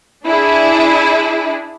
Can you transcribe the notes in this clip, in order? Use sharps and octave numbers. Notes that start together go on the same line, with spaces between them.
D4 E4 G#4